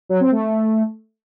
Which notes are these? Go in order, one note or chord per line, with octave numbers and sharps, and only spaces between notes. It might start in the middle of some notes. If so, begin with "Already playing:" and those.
F#3
C4
A3